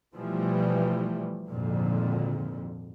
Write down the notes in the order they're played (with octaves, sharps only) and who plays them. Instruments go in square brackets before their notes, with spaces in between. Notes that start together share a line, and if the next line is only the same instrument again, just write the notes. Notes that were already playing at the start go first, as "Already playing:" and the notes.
[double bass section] B2 E3 F3 G3 A3
G#1 F2 A#2 D3